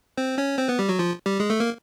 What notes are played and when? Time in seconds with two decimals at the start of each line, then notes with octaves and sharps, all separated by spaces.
0.17 C4 C5
0.38 C#4 C#5
0.58 C4 C5
0.68 B3 B4
0.79 G3 G4
0.89 F#3 F#4
0.99 F3 F4
1.26 G3 G4
1.40 G#3 G#4
1.50 A3 A4
1.60 A#3 A#4